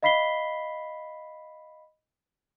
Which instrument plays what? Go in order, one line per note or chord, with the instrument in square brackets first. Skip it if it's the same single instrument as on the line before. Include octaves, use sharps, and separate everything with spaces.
[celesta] D#5 F5 B5 B6 C7 G7